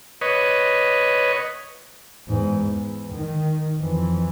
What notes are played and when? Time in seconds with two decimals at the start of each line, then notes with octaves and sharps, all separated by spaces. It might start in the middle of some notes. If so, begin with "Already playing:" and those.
0.21 B4 C#5 D#5
2.28 E2 G#2
2.62 E2
3.13 D#3
3.77 F2 E3